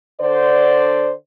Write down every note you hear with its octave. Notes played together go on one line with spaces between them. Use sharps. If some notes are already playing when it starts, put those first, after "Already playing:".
D3 C5 D5